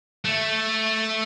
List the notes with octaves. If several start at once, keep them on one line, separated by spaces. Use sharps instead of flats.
A3